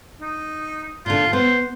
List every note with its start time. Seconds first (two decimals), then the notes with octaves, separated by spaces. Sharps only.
0.21 D#4
1.06 A#2 D3 F4
1.33 B3 C5